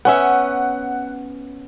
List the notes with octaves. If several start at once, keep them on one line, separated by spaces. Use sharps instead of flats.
B3 C#4 E5 F#5